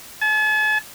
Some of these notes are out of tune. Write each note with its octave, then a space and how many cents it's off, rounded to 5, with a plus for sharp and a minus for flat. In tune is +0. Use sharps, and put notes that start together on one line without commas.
A5 -45